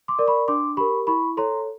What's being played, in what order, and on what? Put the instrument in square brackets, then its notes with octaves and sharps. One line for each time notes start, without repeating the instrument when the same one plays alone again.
[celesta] C6 D6
A#4 D5
B5 C#6
D4 C6 D6
G4 A#4 B5 C#6
E4 B5 C#6
A4 C#5 A#5 C6